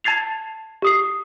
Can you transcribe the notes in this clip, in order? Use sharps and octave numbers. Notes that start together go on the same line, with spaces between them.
A5 G#6 A6 C7 F7
G4 D#6 C7